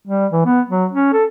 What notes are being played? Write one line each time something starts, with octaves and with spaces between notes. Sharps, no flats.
G3
E3
B3
F#3
C#4
A4